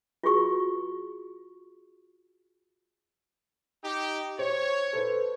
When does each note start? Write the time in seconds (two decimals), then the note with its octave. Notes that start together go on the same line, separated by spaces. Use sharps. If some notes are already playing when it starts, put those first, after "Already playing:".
0.23 F4 F#4 G#4 C#6
3.84 D#4 G4
4.39 C5 C#5
4.93 A4 B4 C5